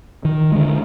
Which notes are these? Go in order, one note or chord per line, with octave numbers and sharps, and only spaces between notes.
D#3
D3 G#3